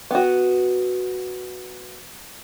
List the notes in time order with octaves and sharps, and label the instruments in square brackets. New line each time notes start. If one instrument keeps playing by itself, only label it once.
[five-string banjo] B3 F#4